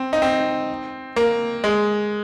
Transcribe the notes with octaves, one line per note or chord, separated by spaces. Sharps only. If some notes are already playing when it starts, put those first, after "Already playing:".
Already playing: C4
D#4
C4
A#3
G#3